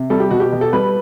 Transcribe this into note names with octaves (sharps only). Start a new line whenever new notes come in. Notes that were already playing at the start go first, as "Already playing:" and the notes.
Already playing: C3
G3 A4
G4
B2 F#4
G4
B2
A4
G3 B4